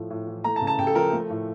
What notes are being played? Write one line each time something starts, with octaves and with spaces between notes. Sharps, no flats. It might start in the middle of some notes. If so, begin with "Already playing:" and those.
Already playing: A2 F3 A3
A2
E3
A3 A#5
A5
C#3
A5
C#3 G5
A4
F3 A#4
A3
A2